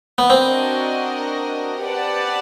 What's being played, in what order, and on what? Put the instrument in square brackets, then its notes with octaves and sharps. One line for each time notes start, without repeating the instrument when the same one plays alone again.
[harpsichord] B3
[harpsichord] C4 [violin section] D4 F#4 A#4 D#5
[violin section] G4 B4 D5 F#5 A5